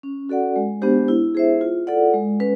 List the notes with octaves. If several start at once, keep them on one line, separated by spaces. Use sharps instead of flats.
C#4
F#4 A4 D5 F#5
G#3
B3 D4 G4 C5
E4
G#4 C5 E5
F4
A4 D5 F#5
G#3
C#4 B4